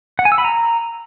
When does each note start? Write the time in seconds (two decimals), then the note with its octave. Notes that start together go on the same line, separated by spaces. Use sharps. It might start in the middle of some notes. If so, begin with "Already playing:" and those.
0.19 F#5
0.25 G#5
0.32 E6
0.38 B5
0.45 A#5